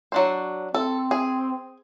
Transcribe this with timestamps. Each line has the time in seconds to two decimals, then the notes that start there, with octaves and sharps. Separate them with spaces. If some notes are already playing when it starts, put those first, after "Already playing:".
0.12 F#3 D4 C5
0.74 C4 A4
1.11 G#4